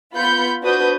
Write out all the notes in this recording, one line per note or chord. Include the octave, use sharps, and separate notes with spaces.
B3 F4 B5 G6 C#7
D4 F#4 B4 C5 D#6 G6